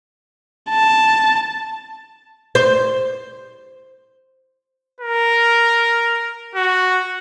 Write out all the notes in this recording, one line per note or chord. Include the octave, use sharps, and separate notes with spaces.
A5
C5
A#4
F#4